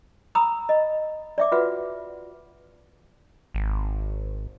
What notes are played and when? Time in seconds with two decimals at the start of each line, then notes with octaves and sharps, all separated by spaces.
0.35 A#5 B5 D#6 E6
0.69 D#5
1.38 D5 E5 D6
1.52 F4 F#4 B4 E5 F#5
3.54 G#1